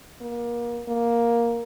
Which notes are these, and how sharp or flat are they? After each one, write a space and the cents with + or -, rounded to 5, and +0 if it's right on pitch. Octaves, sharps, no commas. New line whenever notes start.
A#3 +30
A#3 +10